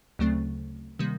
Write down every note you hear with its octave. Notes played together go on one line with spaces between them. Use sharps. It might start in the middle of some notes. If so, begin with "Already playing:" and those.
D2 C#3 F#3 A3 C4
C3 D#3 G3 A#3